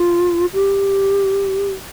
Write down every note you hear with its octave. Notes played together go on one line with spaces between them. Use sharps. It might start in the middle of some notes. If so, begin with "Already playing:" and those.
Already playing: F4
G4